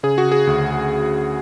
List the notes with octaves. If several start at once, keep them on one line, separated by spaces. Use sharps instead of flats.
C#3 G#4
F#4
G#4
D2